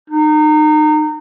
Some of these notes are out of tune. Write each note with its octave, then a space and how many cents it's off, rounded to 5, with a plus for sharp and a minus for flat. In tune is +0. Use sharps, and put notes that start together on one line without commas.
D#4 -25